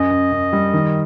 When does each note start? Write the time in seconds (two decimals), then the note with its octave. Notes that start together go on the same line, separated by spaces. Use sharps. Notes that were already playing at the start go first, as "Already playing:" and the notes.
Already playing: F#2 D#5
0.11 F#2
0.32 F#2
0.53 G3
0.73 D#3